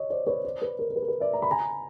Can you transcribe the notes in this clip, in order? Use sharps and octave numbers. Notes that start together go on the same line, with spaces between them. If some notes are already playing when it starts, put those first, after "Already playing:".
Already playing: C#5 D#5
C5 D5
B4 C#5
C5 D5
B4
A#4
A#4
B4
A#4
B4
D5 E5
A#5
B5
G#5 A#5